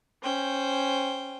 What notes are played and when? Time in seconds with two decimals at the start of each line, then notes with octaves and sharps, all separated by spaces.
0.23 C#4 C5 G5